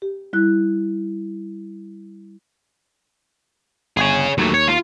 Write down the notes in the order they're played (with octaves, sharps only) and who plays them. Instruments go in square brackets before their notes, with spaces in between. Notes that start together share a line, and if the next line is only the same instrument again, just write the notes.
[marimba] G4
G3 E4 F#6
[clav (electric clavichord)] G1 G#5 [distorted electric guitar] G#4 C#5
[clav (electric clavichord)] D#2 [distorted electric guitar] F#3 A3
[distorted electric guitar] C#5
F4